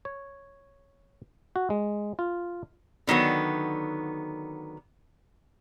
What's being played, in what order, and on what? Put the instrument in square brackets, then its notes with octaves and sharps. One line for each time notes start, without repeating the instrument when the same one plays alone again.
[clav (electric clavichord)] C#5
F#4
G#3
F4
[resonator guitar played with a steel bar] D3 D#3 F#3 B3